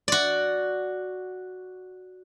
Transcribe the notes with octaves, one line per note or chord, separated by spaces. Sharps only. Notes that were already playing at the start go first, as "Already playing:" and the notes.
F#4 D5